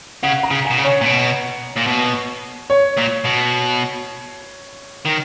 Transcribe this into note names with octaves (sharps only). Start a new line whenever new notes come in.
C#3 F#5
A#5
C#3
G#5
B2
C#3
C#5
A#2
B2
A#2
B2
C#5
A#2
B2
D#3